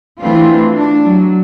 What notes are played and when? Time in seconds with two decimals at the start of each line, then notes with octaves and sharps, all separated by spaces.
0.21 E3 A3 C4 D4 F4
0.76 D4
1.04 F#3